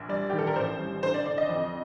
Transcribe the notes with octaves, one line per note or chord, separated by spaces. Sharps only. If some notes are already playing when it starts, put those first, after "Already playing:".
Already playing: A#1
G3 D5
D#3 G4
A4
A#4
A1 C5
G3
D3 C5
D5
D3 D5
D#5
F2